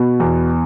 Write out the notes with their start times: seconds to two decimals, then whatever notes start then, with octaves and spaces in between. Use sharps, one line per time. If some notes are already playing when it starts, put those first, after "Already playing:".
Already playing: B2
0.20 E2